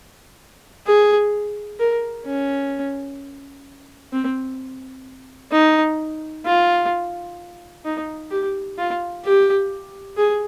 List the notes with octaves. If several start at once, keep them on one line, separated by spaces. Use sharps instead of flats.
G#4
A#4
C#4
C4
D#4
F4
D#4
G4
F4
G4
G#4